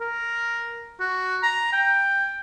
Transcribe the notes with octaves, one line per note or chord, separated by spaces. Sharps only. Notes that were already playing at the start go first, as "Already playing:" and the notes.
A#4
F#4
A#5
G5